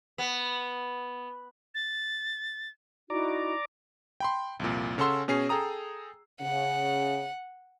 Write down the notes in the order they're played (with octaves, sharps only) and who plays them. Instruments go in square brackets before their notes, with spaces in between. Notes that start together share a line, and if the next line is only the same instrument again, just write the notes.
[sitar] B3
[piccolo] A6
[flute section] D#4 E4 F#4 [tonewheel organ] D5 A#5 D6
[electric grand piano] G5 B5 C6
C2 F2 A#2
C#3 C#4 A4 F#5 C6 E6
B2 C#4 G#4 C7
G#4 A4 G5 A#5 D#6
[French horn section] C#3 [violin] F#5